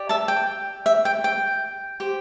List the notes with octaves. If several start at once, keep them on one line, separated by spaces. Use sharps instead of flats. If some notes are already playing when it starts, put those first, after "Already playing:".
Already playing: G4 D5
E5 A5
G5
E5
G5
G5
G4 C5